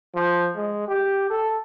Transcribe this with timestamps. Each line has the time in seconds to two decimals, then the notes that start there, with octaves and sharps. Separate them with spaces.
0.15 F3
0.57 G#3
0.88 G4
1.30 A4